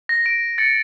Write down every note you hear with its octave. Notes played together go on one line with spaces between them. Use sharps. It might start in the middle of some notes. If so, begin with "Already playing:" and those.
A#6
A#6 D7
A6 C#7